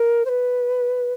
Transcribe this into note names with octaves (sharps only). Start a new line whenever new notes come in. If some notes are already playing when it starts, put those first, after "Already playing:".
Already playing: A#4
C5
B4